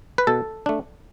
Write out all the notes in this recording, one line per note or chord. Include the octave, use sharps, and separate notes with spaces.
B4
B2 A4
A3 D4